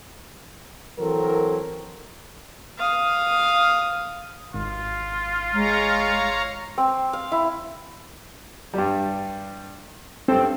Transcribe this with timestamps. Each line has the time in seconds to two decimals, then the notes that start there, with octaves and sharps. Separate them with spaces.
0.98 E3 F#3 C4 A4 A#4
2.78 F5 D#6
4.54 G#1 F4
5.54 G#3 C#5 F5 A#5
6.78 C4
7.13 F5
7.32 E4
8.74 G2 G3
10.28 G2 C4 A4